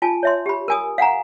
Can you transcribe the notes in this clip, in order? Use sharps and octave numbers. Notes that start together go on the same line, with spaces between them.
F4 G#5 A5
C#5 E5 C6
G4 B5
A#4 G#5 D#6
F5 F#5 G#5 A#5